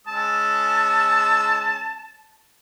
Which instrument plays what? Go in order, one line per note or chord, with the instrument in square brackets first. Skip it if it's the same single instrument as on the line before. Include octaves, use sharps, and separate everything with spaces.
[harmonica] G#3 C#4 E6 [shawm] A5